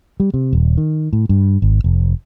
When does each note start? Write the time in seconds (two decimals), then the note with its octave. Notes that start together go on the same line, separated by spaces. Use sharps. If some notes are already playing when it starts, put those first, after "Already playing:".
0.20 G3
0.34 C3
0.53 D#1
0.78 D#3
1.13 A2
1.29 G2
1.62 G#1
1.84 F1